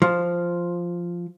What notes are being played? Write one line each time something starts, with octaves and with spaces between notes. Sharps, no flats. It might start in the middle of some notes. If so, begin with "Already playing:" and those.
F3